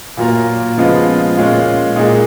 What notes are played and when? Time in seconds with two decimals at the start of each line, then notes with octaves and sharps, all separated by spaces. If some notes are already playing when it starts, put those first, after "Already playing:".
0.17 A#2 F#3 A#3 F4 A#4
0.77 C#3 F3 G#3 B3 F4
1.37 A#2 G#3 C#4 F4
1.96 A#2 G#3 D#4 G#4